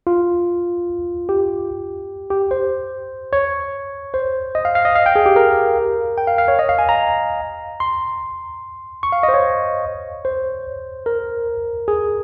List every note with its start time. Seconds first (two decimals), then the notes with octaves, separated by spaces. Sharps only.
0.07 F4
1.29 G4
2.31 G4
2.51 C5
3.33 C#5
4.14 C5
4.55 D#5
4.65 F5
4.75 F5
4.85 D#5
4.95 F5
5.06 G5
5.16 G#4
5.26 G4
5.36 A#4
6.18 G5
6.27 F5
6.38 F5
6.48 C#5
6.59 D#5
6.69 F5
6.79 G#5
6.89 A#5
7.80 C6
9.03 C#6
9.12 F5
9.23 D#5
9.28 C5
9.34 C#5
10.25 C5
11.06 A#4
11.88 G#4